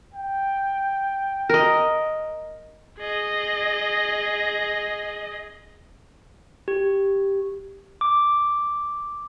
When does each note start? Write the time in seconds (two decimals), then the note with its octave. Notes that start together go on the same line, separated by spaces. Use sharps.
0.14 G5
1.49 A#4 D#5
2.99 G#4 D#5
6.68 G4
8.01 D6